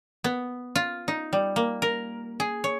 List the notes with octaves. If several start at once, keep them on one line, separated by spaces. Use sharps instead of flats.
B3
F4
D#4
G3
A#3
A#4
G#4
C#5